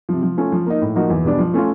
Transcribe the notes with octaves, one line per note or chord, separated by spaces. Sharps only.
C3 F3
F3
A3 C#4 F4
F3
A#3 D#4
A2
F3 A#3 D#4 F#4
E2
B2 G3 B3 D4
F3
A3 C#4 F4